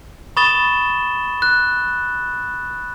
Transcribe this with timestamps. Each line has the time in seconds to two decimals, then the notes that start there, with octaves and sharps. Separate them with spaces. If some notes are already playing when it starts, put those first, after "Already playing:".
0.37 B5 C#6 D#6 A6 E7 G7
1.42 F#6